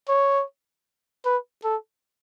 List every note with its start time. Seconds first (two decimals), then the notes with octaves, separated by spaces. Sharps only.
0.09 C#5
1.25 B4
1.64 A4